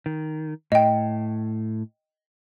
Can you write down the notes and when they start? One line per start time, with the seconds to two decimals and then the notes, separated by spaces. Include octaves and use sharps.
0.06 D#3
0.72 A2 D#5 G5